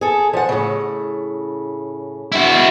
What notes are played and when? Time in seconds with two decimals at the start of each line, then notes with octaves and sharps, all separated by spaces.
0.01 G#4 A4
0.33 F3 F#5
0.49 A2 C#3
2.32 E4 F#4